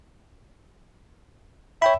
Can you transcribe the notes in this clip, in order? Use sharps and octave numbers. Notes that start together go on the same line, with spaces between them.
C#5 E5 G5 B5